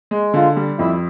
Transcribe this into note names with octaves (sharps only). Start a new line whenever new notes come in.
G#3
D3 F4
G3
F2 E4